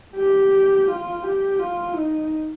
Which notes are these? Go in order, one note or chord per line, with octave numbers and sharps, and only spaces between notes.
G4
F4
G4
F4
D#4